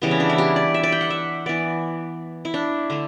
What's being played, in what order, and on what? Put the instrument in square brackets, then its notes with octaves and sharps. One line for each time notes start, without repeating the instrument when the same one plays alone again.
[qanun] C#3 E3 G3 B3
C#4
D4
E4
G4
D5
E5
D5
G5
F#5
E5
E3 B3 D5
E4
D4
D3 A3